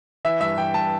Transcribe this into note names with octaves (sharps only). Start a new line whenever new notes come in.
E3 E5
G2 E5
E3 G5
G2 A5